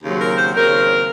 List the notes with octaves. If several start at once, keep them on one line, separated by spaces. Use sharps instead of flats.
D#2 C#3 F#3 C4
A#4
C5
D#2 C#3 F#3 C4 A#4